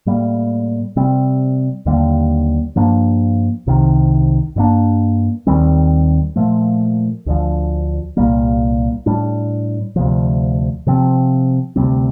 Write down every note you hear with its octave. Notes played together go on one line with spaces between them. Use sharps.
A2 G3 A#3
C3 G3 C4
D#2 D3 G3 A#3
G2 F3 A#3 D4
C2 C3 D#3
G2 D#3 A#3 D4
D#2 D#3 G3 C4
A#2 F3 A3
D2 D3 F3
C2 A#2 G3 A#3
A2 G3 D4
D2 C3 F3
C3 F3 C4
D2 C3 G3 C4